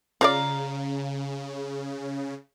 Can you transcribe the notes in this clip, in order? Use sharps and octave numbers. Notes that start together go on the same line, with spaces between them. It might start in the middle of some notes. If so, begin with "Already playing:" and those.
C#3 F4 C#5 D5 F5 A#5